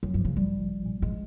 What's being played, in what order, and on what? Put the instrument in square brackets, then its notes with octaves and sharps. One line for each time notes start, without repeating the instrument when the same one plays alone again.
[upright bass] F#2 [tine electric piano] F3
[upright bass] G2 [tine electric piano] F3
[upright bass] C#3
[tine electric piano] A#1 [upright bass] G3
[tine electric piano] A#1
F3
A#2
[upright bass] G#3